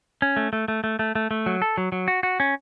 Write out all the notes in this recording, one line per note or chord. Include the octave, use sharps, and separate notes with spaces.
C#4
A3
A3
A3
A3
A3
A3
A3
F#3
A4
F#3
F#3
F#4
F#4
C#4